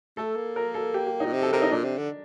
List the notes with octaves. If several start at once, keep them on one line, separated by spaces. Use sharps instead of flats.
A3 A4
A#3
A#4
A4
G4
G4
A#2 D#4
C3
A4
C3 A#4
D#4
A#2 D4
C3
D3